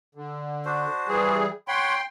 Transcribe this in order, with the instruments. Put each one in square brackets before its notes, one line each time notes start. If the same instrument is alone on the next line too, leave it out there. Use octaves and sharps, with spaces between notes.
[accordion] D3
[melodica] D4 F#4 C5
[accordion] E3 G3 G#4
[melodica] C#5 F#5 B5 [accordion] G5 C6